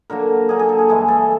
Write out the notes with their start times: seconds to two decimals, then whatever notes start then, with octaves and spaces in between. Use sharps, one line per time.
0.10 D3 F#3 A#3 A#4
0.49 D3 F#3 A#3 G#4
0.59 G#4
0.69 A4
0.79 G#4
0.89 G2 E3 G#3 G#4
1.08 A4